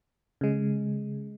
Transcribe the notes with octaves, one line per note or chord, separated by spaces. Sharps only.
C#3 G#3